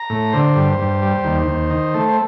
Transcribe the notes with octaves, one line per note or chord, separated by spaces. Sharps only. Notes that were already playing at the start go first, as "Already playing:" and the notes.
Already playing: A#5
A2
D3 C5
G2
G2
G3
D#2
D#2
D#3
A3
C5